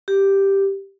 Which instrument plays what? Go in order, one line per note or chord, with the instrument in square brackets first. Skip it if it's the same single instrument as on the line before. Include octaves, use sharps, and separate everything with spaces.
[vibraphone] G4